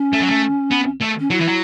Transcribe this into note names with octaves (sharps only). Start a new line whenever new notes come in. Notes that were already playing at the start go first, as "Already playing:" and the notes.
Already playing: C#4
A3
F#3
A3
B3
A3
C#4
F#3 E4
E3
F#3